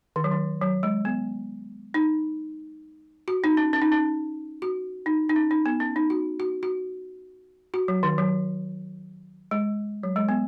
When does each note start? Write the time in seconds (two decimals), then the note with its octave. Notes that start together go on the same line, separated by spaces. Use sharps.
0.16 D#3
0.24 F#3
0.31 D#3
0.62 F#3
0.83 G#3
1.05 B3
1.94 D#4
3.28 F#4
3.44 D#4
3.57 C#4
3.73 C#4
3.82 D#4
3.92 C#4
4.62 F#4
5.06 D#4
5.29 D#4
5.36 C#4
5.51 D#4
5.66 B3
5.80 C#4
5.96 D#4
6.10 F#4
6.40 F#4
6.63 F#4
7.74 F#4
7.88 F#3
8.03 D#3
8.18 F#3
9.51 G#3
10.03 F#3
10.16 G#3
10.29 B3